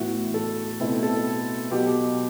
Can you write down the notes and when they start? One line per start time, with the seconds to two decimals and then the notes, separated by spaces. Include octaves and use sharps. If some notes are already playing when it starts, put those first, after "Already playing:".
Already playing: A2 E3 B3 E4 F#4
0.34 A4
0.80 B2 A3 C4 E4
1.03 A4
1.71 B2 F#3 B3 G4